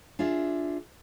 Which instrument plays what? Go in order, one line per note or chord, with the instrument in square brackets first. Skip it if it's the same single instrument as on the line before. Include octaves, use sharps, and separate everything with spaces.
[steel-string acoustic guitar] D4 F4 G#4 E5